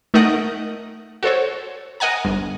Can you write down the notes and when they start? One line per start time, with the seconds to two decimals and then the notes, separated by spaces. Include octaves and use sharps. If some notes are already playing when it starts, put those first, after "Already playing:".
0.14 A3 D#4 A#4 D#5 F#5 G6
1.23 F#4 A4 C5 C#5
2.00 A#4 D#5 F#5 G#5 A#5
2.25 G1